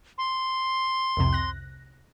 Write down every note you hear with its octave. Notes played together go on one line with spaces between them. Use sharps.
C6
C2 F2 C3
F#6 A#6